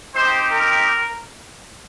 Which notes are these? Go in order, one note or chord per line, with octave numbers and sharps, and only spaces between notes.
C4 D#4 G4 C5
A#4